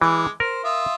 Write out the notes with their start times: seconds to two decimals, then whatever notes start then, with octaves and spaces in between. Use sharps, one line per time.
0.02 E3 G#3 D6
0.40 A#4 C5
0.64 F4 E5 D#6